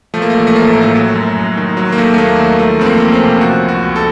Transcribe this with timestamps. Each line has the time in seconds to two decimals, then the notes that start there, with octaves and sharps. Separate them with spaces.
0.14 F3 A3
0.22 A#3
0.30 A3
0.34 A1
0.39 A#3
0.47 A3
0.55 A1 A#3
0.65 A3
0.73 A2 A#3
0.82 A3
0.96 F#3
1.15 F#2
1.36 F#2
1.57 D#3
1.77 F#3
1.92 A#3
1.98 D#2 A3
2.14 A3
2.18 D#2 A#3
2.39 D#3 F#3
2.59 F3 A3
2.79 F2 C4
2.86 A#3
3.00 F2
3.08 C#4
3.14 C4
3.21 C3
3.41 F3 F#4
3.62 C#2
3.69 F#4
3.83 C#2
3.96 A4